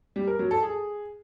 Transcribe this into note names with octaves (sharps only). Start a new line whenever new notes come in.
G3
A#4
F#3
A4
G#4